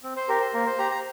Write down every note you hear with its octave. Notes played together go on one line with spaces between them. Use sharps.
C4
C5
G4 A#4
C5
A#3 A#4
C5
G4 A#5
A#5